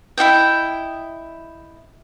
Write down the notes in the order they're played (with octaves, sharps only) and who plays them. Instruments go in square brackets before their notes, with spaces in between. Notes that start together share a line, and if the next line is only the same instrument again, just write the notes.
[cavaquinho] E4 F#4 D#5 G5